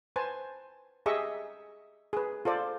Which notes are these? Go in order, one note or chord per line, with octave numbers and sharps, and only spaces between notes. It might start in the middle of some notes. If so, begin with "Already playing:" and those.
B4 C5 G#5 A5
G4 G#4 D#5 E5 C#6
G#4 B4
F4 A4 C5 D5